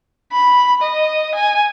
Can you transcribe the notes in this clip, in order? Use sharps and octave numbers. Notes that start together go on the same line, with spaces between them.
B5
D#5
G#5